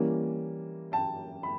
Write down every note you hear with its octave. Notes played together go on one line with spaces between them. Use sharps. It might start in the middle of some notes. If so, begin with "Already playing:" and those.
Already playing: E3 G3 A#3 C#4
G5 A5
B5